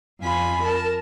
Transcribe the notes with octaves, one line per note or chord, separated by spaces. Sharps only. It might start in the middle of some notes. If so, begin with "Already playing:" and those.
F2 F4 G#5 B5
A#4 A5